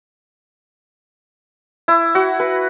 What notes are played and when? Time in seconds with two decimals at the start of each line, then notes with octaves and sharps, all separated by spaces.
1.88 E4
2.15 F#4
2.40 B4